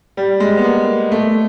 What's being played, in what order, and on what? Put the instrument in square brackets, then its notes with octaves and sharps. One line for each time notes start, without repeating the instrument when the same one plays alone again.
[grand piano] G3
G#3
B3
A#3
A3